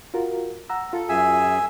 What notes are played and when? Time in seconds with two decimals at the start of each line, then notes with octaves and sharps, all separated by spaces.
0.14 F4 F#4 A#4
0.70 F#5 A#5 E6
0.93 F4 A4
1.09 F#2 G#4 E5 G#5 E6